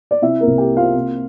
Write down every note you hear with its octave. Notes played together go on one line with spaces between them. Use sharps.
D5
C3 E4 E5
A#3 A#4
C2
G4 G5
A#3
F4 F5
C3